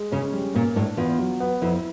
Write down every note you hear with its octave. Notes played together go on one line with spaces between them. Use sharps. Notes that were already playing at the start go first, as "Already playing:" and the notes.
Already playing: G#3
C#3 C#4
G3
A#2 A#3
A2 D4
E2 F4
F#3
B3
F2 E4